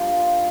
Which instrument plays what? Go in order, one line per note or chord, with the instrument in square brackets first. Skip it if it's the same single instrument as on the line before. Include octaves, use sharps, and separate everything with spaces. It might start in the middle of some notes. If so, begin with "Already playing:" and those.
Already playing: [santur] G3 A#3 D4 F4 G4